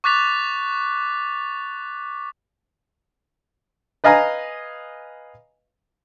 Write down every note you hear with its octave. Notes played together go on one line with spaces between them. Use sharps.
C#6 D6 F#6 A6 B6 F7
B4 D#5 F5 G#5 A#5